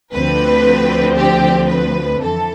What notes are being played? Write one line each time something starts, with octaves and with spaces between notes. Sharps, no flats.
D2 D3 F3 C4 B4
G4
B4
F2 E3 A4